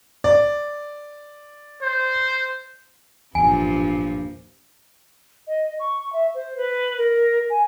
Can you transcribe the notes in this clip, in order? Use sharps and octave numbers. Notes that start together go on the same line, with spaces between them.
D5
C5
G#1 E2 G2 A#2 F3 G#5
D#5
C#6
E5
C5
B4
A#4
G#5